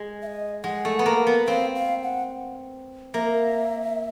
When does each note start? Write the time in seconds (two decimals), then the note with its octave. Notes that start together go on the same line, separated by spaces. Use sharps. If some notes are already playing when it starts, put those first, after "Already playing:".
Already playing: G#3
0.22 E5
0.27 D#5
0.64 G#3 F#5
0.85 A3
0.99 B3
1.06 A#3
1.27 B3
1.47 C4 F5
1.75 F5
2.03 F#5
3.14 A#3 E5